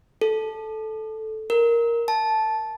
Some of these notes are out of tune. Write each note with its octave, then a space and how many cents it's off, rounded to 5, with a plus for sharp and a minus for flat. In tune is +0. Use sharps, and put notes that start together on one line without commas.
A4 -10
A#4 +0
A5 -10